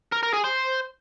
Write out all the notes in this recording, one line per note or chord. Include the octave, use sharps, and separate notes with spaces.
A#4
A#4
G#4
C5